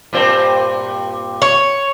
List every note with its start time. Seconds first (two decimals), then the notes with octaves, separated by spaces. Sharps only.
0.13 G2 A#2 C4
1.42 C#5